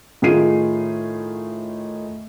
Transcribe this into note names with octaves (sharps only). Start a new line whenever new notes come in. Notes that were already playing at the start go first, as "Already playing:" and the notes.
A2 D#3 F4 G#4 C7 D#7